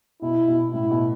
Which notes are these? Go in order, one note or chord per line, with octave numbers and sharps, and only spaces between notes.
B2 E4
B2
A2 E4
B2